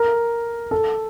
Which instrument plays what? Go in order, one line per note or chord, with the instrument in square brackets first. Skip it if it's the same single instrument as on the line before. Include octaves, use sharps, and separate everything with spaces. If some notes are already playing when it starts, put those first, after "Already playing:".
Already playing: [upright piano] A#4
A4